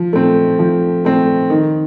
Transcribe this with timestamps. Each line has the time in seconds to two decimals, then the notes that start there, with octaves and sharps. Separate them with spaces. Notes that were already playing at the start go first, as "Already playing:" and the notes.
Already playing: F3
0.13 A3 C4
0.59 F3
1.05 A3 C4
1.50 D#3